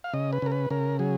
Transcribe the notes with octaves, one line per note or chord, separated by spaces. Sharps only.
F5
C#3 D#5
B4
C#3 A#4
B4
C#3 A#4
F#3 G#4